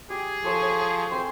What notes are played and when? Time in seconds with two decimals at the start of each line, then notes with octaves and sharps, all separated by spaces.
0.10 G4 G#4
0.44 F3 A4 C#5 A5
0.61 C#5
1.12 C4 C5 G#5 C6